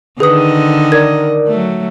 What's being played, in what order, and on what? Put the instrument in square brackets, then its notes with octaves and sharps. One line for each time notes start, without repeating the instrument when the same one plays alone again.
[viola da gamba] D3 D#3 D#5 [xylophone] G#4 B4 D#6
[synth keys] A#4 D5 [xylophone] G#6
[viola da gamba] F#3 A3